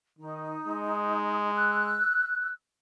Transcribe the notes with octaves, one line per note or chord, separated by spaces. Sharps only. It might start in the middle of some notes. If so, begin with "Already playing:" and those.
D#3 D#4
G#3
E6 F#6